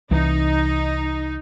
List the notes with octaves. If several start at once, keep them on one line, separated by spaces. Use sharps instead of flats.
C2 E3 D#4